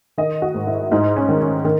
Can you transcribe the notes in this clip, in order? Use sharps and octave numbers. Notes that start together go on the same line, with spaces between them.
D#3 D#5
F#4
G#2
E4
G#2 D#4
C#4
D#3
C#4
D#3